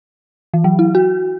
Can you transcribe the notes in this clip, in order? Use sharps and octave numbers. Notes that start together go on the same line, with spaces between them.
E3
F#3
E4
F#4